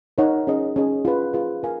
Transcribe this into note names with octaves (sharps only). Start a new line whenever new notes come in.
D#4 A#4 C#5 F#5
C#4 G#4 D#5
C#4 G#4 D#5
F4 G#4 B4
F4 G#4 B4
F4 A#4 F5 G#5